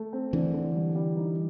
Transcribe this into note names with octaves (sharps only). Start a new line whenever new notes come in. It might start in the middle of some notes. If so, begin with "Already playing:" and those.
Already playing: A3
C4
D3 E3
D3
G3
G3
D#4